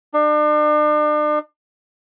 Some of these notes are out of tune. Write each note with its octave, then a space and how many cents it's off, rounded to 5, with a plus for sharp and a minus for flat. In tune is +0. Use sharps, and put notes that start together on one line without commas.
D4 +40